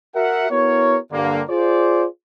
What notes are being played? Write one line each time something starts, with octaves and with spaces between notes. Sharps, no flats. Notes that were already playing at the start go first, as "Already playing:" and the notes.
F#4 A#4 E5 F#5
B3 E4 F#4 A#4 C#5
G2 D3 A#3
F4 G#4 C5 D5